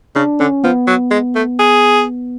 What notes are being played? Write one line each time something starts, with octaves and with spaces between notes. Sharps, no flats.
C#3 D4
D3 C#4
F3 B3
F#3
G#3
A3
G#4